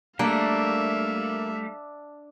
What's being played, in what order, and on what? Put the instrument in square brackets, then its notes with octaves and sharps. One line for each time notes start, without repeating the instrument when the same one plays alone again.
[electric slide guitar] G3 A3 [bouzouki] A#3 [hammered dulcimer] D4 [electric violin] E5 F5